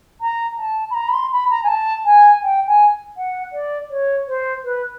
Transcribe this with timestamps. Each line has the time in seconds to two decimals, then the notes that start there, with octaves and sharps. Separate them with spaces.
0.20 A#5
0.58 A5
0.90 B5
0.94 A#5
1.08 B5
1.13 C6
1.31 B5
1.50 A#5
1.63 G#5
1.68 A5
2.05 G#5
2.43 G5
2.67 G#5
3.16 F#5
3.52 D5
3.90 C#5
4.27 C5
4.64 B4